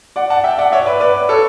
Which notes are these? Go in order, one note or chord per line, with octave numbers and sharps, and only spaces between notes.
D5 F#5
F#5 A5
E5 G5
D5 F#5
C#5 E5
B4 D5
B4 D5
A4 C#5